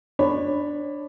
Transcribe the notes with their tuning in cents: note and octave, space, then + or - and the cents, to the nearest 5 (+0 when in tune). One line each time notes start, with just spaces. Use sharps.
D4 +0 C#5 -20 B5 +5